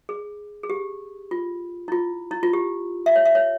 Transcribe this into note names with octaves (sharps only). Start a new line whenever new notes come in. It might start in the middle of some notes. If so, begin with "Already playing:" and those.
G#4
G#4
G4
F4
E4
F4
E4
F4
G4
E5
C#5
E5
C#5